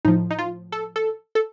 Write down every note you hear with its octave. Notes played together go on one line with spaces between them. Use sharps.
A2 F3 D#4
D#4
F4
A4
A4
A4